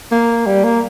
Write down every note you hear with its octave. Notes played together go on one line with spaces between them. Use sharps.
A#3
G3
A#3